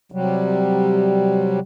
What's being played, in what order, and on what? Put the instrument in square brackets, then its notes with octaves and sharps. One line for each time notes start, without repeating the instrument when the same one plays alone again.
[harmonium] C3 F#3 G3